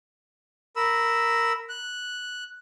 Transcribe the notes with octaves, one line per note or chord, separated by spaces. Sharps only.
A#4 B5 E6
F#6